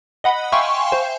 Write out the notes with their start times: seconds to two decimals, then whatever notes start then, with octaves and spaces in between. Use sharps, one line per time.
0.24 D#5 F#5 B5
0.52 E5 F5 G5 G#5 C6 C#6
0.92 C5